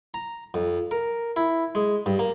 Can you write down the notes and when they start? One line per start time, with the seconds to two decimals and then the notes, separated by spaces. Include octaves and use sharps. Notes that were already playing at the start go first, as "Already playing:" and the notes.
0.14 A#5
0.54 F2
0.91 A#4
1.36 E4
1.75 G#3
2.06 G2
2.19 A#3